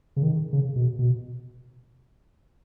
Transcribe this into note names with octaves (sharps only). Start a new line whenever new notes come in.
C#3
D#3
C#3
B2
B2